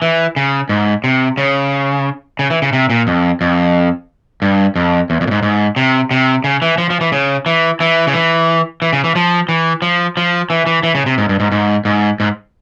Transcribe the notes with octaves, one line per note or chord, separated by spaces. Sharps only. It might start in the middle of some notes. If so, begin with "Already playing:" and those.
E3
C#3
G#2
C3
C#3
C#3
E3
C#3
C3
A#2
F2
F2
G2
F2
E2
F2
A#2
G#2
G#2
C3
C3
C#3
E3
F3
F3
E3
C#3
E3
E3
C#3
E3
E3
C#3
E3
F3
E3
F3
F3
E3
E3
E3
C#3
C3
G#2
G2
G#2
G#2
G#2
G#2